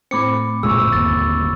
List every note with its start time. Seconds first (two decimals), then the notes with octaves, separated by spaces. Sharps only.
0.11 A2 C4 B5 D6 C#7
0.63 G1 A#2 G#3 C#6 E6
0.93 G1 D#2 A6